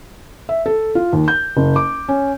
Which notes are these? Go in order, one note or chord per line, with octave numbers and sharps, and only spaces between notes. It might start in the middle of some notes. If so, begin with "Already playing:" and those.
E5
A4
F4
D#2
G6
F#1
D6
C#4